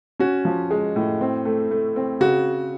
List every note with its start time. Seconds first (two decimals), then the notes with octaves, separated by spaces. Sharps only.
0.19 C#4 F#4
0.45 F3
0.71 G#3
0.96 A2
1.21 C4
1.45 A3
1.71 A3
1.96 C4
2.20 C#3 F#4